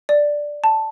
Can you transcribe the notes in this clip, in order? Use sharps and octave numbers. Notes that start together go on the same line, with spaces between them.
D5
A5